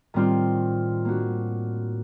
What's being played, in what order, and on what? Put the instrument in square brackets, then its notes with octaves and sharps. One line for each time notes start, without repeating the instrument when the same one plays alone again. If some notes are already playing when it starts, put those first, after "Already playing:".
[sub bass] A2 [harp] D#3 G3 C4 F4
[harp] A#3 D4 F#4